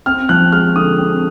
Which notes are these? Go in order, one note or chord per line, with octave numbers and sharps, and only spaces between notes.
C4 F6
F3 F#6
G#3 F6
D3 D#6
C4